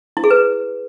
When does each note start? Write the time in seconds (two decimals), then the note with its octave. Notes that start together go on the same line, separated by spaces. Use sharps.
0.17 E4
0.24 G#4
0.31 B4